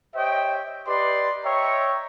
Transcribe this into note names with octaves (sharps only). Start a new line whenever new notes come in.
G4 C5 C#5 D#5 E5 G5
G4 B4 D5 D#5 C6
C#5 D#5 E5 G5 A#5 C#6